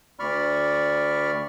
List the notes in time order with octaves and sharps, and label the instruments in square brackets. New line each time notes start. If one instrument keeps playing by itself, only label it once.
[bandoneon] D2 D5 B5 C#6 F6